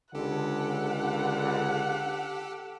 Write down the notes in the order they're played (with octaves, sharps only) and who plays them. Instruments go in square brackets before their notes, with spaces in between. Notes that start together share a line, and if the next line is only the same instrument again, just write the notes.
[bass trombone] C#2 [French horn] D3 [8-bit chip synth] G4 A4 [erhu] F#5